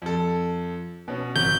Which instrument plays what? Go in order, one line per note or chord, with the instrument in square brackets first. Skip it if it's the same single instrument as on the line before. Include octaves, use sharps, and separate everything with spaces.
[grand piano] F2 A4
B2 C#4
[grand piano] G#1 [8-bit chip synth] G6